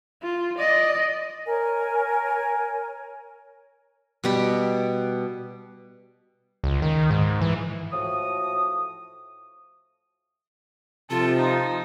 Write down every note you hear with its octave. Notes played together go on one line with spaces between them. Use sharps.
F4
D5 D#5
A#4 C#5 G#5
B2 G3 G4
C#2
D#3
G#2
E3
A2 F3 F#4 D#6
C3 F3 F4 A4
D#4